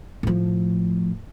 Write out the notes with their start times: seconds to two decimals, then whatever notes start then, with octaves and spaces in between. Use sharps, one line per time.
0.23 A2 F3